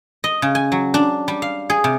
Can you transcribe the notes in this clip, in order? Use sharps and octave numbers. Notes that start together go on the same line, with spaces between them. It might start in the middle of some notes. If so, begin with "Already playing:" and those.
D#5
C#3
G#5
F#3
D4
G3
F5
G#4
C3